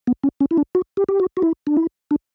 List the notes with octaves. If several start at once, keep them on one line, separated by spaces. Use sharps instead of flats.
B3
C#4
C#4
E4
D4
F#4
G4
G4
F#4
F#4
E4
D4
E4
D4